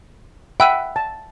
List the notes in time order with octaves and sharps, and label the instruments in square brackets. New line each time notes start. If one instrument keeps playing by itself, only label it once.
[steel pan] E5 F#5 B5 [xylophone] G5 E6 D#7
[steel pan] A5